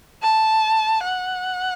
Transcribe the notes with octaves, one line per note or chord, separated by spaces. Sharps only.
A5
F#5